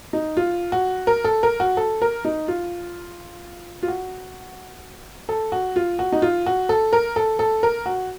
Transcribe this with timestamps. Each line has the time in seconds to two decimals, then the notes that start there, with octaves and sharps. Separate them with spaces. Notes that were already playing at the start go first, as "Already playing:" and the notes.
0.13 D#4
0.37 F4
0.72 F#4
1.07 A#4
1.24 A4
1.43 A#4
1.60 F#4
1.77 A4
2.02 A#4
2.25 D#4
2.48 F4
3.83 F4
3.88 F#4
5.29 A4
5.52 F#4
5.76 F4
5.99 F#4
6.12 D#4
6.22 F4
6.46 F#4
6.69 A4
6.93 A#4
7.16 A4
7.39 A4
7.63 A#4
7.86 F#4